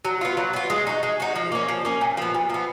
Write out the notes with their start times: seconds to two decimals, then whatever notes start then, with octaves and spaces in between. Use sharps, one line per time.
0.05 F#3
0.21 B3 F4
0.37 F#3
0.53 B3 F4
0.70 G#3
0.87 D#4 F#4
1.03 G#3
1.20 D#4 F#4
1.35 F3
1.52 A#3 C#4
1.68 F3
1.85 A#3 C#4
2.01 A#2
2.17 F3 B3
2.34 A#2
2.50 F3 B3